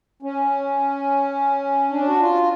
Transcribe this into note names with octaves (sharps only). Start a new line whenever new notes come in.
C#4
D4
F#4
F4